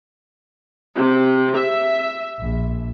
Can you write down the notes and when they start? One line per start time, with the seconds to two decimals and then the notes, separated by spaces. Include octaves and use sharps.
0.96 C3
1.56 E5
2.40 A#1